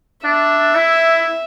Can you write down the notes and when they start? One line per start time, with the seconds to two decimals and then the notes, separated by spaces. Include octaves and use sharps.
0.25 D4 E5
0.76 E4